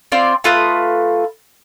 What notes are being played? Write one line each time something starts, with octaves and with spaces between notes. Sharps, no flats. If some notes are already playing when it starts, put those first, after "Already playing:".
C4 F4 D5
A3 F4 B4 D#6